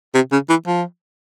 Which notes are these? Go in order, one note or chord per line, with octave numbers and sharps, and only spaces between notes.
C3
C#3
E3
F3